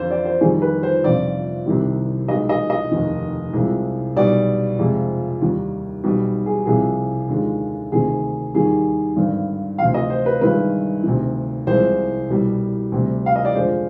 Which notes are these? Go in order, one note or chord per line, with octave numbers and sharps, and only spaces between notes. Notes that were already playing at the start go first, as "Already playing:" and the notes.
Already playing: F2 D3 F3 C5
D5
C5
F2 D#3 G3 G#4
B4
C5
G1 F2 C3 F3 D5
C2 C3 D#3 G3
B1 B2 G#3 D#5
D#5
D#5
F1 D#2 D#3
C2 C3 F3 G#3
B1 B2 G3 D5
F2 C3 F3 G#3
D#2 D#3 G3
B1 B2 G3
G#4
C2 C3 F3 G#4
D#2 D3 F3 G#3
D2 C3 D#3 G#4
D#2 D#3 G3 G#4
G#1 G2 D3
D2 C3 F3 F5
D#5
C5
B4
G1 G2 D#3 G#3 B4
D2 C3 D#3
C2 C3 F3 G#3 C5
C2 B2 G3
D2 C3 G3
F5
D#5
D5
F2 D3 F3 G#3 C5